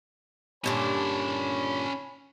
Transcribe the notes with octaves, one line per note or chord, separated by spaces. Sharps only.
G2 A#2 D3 C#4 C#5 G#5 A5 B5